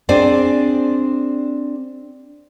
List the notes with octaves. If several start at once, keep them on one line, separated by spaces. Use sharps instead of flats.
C4 D4 G#4 C5 D5 G#5